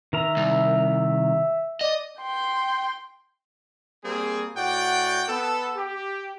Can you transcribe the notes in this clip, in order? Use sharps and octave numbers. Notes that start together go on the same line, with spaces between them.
D#3 A#4 E5 A#5
C2
D5 D#5
G5 C6
G3 A#3 C4 G#4
A2 F#4 D5 F#5 G5
B3 A4
G4